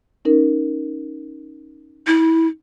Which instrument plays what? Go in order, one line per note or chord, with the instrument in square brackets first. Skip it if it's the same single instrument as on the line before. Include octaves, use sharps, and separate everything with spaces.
[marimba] C#4 D#4 A#4
[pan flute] E4